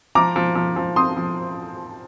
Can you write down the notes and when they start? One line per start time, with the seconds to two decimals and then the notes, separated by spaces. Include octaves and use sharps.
0.15 F3 A#5 D6
0.36 F3
0.55 F3
0.76 F3
0.96 C4 C6 D#6
1.17 F3